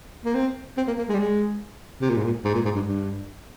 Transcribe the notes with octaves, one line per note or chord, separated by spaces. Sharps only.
A#3
C4
C4
A#3
A#3
G#3
G3
G#3
C3
A#2
G#2
A#2
G#2
A#2
G#2
G2
G2